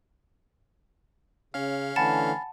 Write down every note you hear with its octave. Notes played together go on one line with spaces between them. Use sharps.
C#3 C#4 F5
D3 E3 A3 F#5 G#5 A5 B5 A6